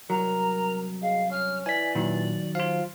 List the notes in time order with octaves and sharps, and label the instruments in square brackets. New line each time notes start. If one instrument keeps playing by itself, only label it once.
[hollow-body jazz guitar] C2 F#3 [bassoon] A#4 [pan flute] A#5
[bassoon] G#3 [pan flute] F5
[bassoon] C#4 [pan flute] F6
[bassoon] E3 [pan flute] D5 [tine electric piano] G#5 B6
[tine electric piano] A#2 [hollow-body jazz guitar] D#3 F#3
[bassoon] F3 [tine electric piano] F4 F5